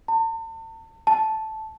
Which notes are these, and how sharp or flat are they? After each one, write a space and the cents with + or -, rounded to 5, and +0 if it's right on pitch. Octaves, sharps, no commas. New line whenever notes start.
A5 +40
A5 -5